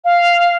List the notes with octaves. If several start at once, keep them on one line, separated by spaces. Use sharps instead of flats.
F5